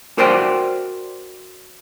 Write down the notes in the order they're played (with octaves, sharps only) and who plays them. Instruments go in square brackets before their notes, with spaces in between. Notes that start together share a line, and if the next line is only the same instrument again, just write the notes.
[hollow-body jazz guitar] F#4 A#4 C5 D5 E5 G5